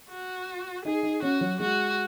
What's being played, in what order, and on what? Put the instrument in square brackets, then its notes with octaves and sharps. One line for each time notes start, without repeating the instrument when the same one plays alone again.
[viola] F#4
[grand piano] D#4 [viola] G#4
[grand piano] D#4
[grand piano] C#4 [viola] F#4
[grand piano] F#3
[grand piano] G#3 [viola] F#4